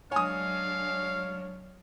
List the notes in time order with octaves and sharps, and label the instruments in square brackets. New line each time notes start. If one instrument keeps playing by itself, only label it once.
[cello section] F#3 G#3 D4 [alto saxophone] C#5 [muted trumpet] F5 [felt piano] G#5 D#6